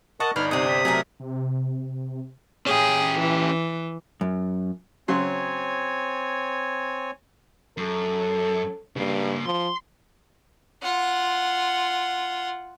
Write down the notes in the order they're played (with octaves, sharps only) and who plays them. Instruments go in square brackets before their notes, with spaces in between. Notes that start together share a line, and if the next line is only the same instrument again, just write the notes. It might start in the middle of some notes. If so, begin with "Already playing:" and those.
[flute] A#4 [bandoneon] D#5 A5 [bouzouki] F#5 [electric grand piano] C#6
[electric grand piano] G1 [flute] D#4 [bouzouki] B4 D5 [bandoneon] F6
[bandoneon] C3 D#6 [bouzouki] C4 D4
[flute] B6
[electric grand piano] F#3 [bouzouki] A3 G#4 A#4
[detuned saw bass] C3
[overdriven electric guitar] C#4 G4 [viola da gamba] G#4
[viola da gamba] E3
[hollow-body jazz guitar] F#2
[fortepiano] C#3 F#3 C6 [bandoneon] C4 C#5 G#5
[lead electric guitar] F#2 [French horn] A4
[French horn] G2 [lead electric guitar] C#3 A#3
[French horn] F3 [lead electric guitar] C6
[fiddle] F4 F#5